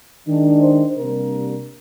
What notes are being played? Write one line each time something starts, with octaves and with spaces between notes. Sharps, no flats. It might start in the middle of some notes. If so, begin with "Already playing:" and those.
D#3 G#3 D4
C5
C3 G3 A#3 D4 A#4